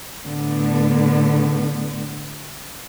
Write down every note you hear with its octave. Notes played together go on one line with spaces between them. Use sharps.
A2 D3 B3